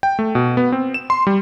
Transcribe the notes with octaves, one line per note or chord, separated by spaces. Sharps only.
G5
A3
B2
B3
C4
E7
C6
G3